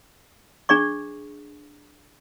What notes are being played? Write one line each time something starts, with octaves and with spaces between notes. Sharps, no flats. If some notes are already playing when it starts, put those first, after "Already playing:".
D4 G#4 D5 C#6